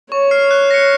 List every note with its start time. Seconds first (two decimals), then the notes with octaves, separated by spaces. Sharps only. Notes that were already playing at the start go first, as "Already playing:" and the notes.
0.12 C#5 C#6
0.31 F6 C7
0.51 F#6
0.71 A#6 C#7